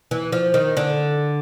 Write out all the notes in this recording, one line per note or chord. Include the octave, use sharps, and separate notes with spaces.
E3
F3
D#3
D3